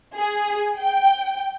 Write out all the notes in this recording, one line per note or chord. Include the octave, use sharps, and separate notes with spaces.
G#4
G5